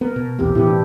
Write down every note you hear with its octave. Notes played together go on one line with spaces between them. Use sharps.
B3 A#4
B2
A#1 E2 B2 C4 G4
A2 E3 B3 E4 G4
D4